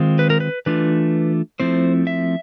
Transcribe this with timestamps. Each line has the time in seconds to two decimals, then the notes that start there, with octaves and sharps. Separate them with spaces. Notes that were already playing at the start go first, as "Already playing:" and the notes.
Already playing: D#3 G#3 C4 F4
0.19 B4
0.30 A#4
0.40 B4
0.66 E3 A3 D4 F4 B4
1.60 F3 A3 C4 E4 C5
2.07 E5